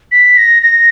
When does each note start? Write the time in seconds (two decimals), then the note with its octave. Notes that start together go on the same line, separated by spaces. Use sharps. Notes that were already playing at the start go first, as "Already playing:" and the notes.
0.12 B6
0.37 A#6
0.62 A#6